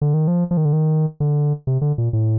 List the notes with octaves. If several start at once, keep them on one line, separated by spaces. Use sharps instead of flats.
D3
D#3
F3
F3
D#3
D3
D#3
D3
C3
D3
A#2
A2